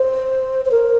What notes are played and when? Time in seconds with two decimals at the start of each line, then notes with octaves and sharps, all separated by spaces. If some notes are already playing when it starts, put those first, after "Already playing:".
Already playing: C5
0.65 C5
0.71 A#4